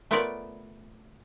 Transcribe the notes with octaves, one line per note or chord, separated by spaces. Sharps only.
A3 B3 F4 A#4 C#5 D5